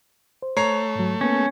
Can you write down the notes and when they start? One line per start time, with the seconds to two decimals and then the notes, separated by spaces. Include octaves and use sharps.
0.42 C5
0.57 A3 C#5 A#5 C7
0.95 G#2 F#3
1.21 A#3 B3 C#4